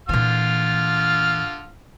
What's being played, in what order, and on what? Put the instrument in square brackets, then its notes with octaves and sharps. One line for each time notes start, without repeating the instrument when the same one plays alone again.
[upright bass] A#2 E3 [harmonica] D3 F4 F6